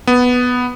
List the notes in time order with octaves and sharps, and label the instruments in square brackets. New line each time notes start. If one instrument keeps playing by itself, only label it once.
[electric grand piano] B3